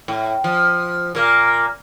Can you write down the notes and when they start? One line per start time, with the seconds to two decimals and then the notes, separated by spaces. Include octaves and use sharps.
0.08 A2
0.44 F3
1.15 A#2 A#3